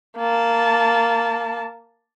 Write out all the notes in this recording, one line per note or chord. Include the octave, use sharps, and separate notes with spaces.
A#3 A5